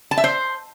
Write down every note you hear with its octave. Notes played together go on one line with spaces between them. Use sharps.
A5
E5
C5